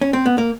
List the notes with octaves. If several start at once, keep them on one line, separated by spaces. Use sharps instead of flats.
C#4
C4
B3
A#3